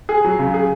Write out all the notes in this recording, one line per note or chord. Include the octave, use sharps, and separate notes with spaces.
G#4
F#3
C#3
G#4